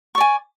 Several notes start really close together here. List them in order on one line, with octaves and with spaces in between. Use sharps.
C#6 D5 G#5